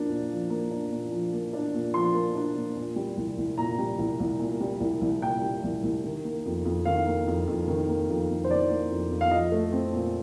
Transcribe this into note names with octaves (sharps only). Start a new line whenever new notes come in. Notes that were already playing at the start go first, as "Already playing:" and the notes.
Already playing: F3 A#3 D4
A#2
F3
A#3
D4
A#2
F3
A#3
D4
A#2
F3 C6
A#3
D4
A#2
A#2
G3
C2
C2
A#2 A#5
G3
C2
C2
A#2
G3
C2
C2
A#2 G5
G3
C2
C2
D#3
A#3
F2
F2
D#3 F5
A#3
F2
F2
D#3
A#3
F2
F2
C5
D#3 D5
A#3
F2
F2
F5
F3 D#5
A3
C4
A#2